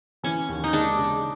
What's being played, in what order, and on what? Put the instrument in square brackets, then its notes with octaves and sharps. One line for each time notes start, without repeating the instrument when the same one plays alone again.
[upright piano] E3 [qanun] C#4
[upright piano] D#2
[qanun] D#4
[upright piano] G#3 [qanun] D4
[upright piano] C#3